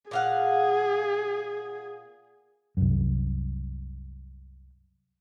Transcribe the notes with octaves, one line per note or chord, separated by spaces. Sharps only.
A#2 G#4 F5 F#5
C2 F#2